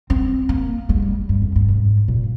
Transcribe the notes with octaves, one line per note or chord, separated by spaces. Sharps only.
C4
A#3
G#3
G3
G2
F2
G2
G#2
A#2